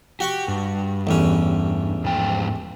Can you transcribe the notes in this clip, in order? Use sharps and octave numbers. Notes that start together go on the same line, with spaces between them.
F#4 G4 F#5 C#6
G2
A1 E2 C#4
G#2 F3 G5